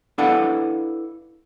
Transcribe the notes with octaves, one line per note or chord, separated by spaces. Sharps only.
D4 E4 A4 B4 F5 F#5